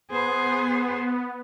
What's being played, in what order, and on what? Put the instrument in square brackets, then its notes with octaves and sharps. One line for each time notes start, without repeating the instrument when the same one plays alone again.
[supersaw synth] B3 [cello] G#4 C5